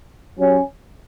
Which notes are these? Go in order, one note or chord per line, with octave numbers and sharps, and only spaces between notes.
F#3 C#4 G4 C#5